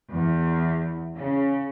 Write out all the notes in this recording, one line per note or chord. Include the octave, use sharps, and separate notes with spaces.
E2
C#3